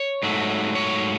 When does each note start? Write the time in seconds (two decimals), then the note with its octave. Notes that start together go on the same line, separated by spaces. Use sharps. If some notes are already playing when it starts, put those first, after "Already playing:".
Already playing: C#5
0.23 G#2 F#3 A3
0.75 C#5